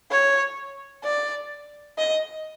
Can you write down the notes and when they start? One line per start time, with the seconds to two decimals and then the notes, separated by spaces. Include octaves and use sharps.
0.11 C#5
1.04 D5
1.98 D#5